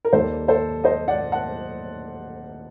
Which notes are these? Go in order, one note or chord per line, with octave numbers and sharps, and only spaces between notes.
A#4
D#2 D#3 G3 A#3 A4 C5
A4 C5
C5 D#5
D5 F#5
F#5 A5